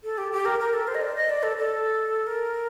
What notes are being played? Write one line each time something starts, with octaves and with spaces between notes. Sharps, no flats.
A4
G4
G4
A#4
A#4
A4
C5
D#5
D5
D#5
D5
A4
A4
A#4